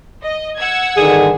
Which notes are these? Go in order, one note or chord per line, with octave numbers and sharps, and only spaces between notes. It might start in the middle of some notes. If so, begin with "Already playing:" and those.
D#5
F#5 E6 G#6
G2 D3 D#3 G#4